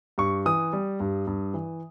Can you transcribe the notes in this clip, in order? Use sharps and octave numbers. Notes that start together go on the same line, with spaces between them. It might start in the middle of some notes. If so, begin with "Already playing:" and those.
G2 C#6
E3 D#6
G3
G2
G2
E3